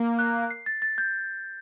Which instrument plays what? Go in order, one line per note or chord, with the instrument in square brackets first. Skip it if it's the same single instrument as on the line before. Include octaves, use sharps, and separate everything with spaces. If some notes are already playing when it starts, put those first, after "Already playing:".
Already playing: [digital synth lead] A#3
[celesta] F#6
C7
A6
A6
G6